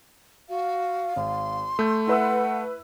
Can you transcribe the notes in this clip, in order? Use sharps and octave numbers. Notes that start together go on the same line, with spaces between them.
F#4 F5
G#1 C6
A3 E6 G6
E4 B4 F#5 E6